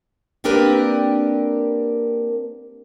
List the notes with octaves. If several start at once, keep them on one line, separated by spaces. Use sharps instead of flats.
A#3 C4 D4 G4 A#4 B4